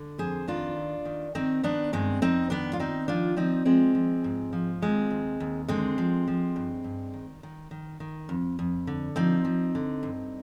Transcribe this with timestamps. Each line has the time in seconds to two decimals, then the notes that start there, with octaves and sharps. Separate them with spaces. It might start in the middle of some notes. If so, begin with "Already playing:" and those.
Already playing: D3
0.18 F2 G#4 C5
0.48 D#3 D4 F4
0.76 D#2
1.05 D#3
1.35 D#3 C4 D#4
1.63 D#3 B3 D4
1.93 G2 G#3 C4
2.22 F2 C4 D#4
2.50 D#3 B3 D4
2.73 F4
2.79 D#3 C4 D#4
3.08 F3 D4 F4
3.36 F3 C4 D#4
3.65 F3 G#3 C4
3.95 F3
4.24 G#2
4.53 F3
4.82 D#2 G#3 C4
5.10 D#2
5.40 D#2
5.68 D3 G#3 C4
5.98 F3
6.27 F3
6.56 G2
6.84 G2
7.13 D#3
7.43 D#3
7.71 D#3
8.00 D#3
8.29 F2
8.59 F2
8.87 D3
9.16 F3 C4 D#4
9.45 F3
9.75 D3
10.03 G2